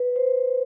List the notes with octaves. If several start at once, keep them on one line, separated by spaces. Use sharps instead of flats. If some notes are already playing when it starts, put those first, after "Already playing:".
Already playing: B4
C5